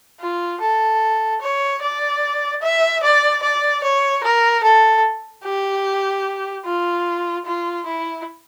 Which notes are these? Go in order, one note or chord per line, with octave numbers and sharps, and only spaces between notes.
F4
A4
C#5
D5
E5
D5
D5
C#5
A#4
A4
G4
F4
F4
E4